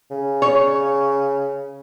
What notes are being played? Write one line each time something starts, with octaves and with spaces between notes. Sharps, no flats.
C#3
C#5